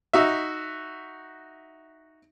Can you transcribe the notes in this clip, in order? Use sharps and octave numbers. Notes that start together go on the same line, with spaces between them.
D#4 F#4 E5